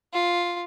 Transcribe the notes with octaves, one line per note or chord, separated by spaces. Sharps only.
F4